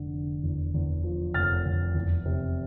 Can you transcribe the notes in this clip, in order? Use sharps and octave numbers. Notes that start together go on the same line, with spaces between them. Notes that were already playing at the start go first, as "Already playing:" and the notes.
Already playing: F1 D3
D3
E2
E2
F3
F1 F6 A6
F1
E2
C3